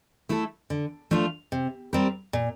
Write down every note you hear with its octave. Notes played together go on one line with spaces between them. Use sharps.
A3 E4 A4
D3
F3 A3 D4 F4
C3
G3 C4 G4 A#4
A#2